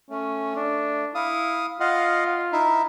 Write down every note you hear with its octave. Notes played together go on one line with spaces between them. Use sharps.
A3 C#4
D4
E4 F5 D#6
F4 D#5 F5 F#5
D#4 E4 E5